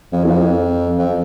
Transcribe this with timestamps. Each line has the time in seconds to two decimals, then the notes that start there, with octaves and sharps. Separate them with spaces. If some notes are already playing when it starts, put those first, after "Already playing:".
0.13 F2
0.24 E2
0.30 F2
0.99 F2